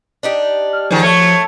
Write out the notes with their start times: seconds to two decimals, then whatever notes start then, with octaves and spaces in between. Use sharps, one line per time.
0.23 D4 D#4 G4
0.73 F6
0.91 G#2 D#3 F3
1.03 A3 C#5